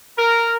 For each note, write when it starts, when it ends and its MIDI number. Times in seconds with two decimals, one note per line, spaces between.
0.18 0.56 70